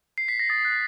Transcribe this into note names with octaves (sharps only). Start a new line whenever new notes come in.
C7
B6
A#6
D#6 A6
F#6